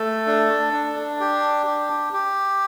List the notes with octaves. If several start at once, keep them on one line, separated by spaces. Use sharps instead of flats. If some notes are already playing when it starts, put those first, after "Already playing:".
Already playing: A3 A4
D4
D4
G4
G4
G4